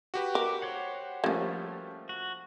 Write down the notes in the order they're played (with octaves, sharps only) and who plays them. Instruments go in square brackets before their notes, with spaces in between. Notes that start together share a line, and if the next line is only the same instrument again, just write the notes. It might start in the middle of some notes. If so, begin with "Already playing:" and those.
[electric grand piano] F#4 G4 B4
[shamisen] A#4 [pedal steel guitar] D6
[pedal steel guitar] C5 C#5 F#5
[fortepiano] F3 G3 A3 [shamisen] A#3 C#4
[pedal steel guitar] F#4